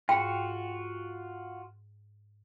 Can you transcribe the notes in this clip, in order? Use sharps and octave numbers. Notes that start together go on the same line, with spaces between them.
G#2 F4 F#4 G5